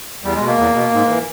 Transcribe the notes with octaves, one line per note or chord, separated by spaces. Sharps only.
E2 G3
G#3
B2
A#3
E2
B2
G#2
E3